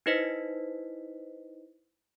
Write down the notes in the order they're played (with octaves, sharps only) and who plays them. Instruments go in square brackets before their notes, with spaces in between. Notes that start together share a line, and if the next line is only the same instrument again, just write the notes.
[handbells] D#4 E4 B4 C5 D#5 B6